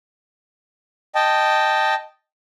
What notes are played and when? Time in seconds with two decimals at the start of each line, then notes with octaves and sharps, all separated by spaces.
1.15 D#5 G5 A5